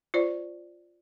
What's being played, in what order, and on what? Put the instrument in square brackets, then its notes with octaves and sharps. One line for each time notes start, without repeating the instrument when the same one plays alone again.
[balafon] F4 C5 D5